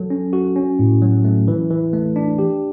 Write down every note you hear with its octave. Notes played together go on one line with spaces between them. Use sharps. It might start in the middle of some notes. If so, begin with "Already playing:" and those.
Already playing: F#3 A4
C#4
F#4
C#4
A2
F#3
A3
E3
E3
A3
D4
G4